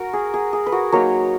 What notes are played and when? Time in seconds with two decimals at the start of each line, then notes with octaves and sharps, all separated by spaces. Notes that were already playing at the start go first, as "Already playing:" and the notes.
Already playing: F#4 A#4
0.13 G#4
0.34 G#4
0.53 G#4
0.66 B4
0.72 F#4 A#4
0.92 F#3 A#3 D#4 A#4 C#5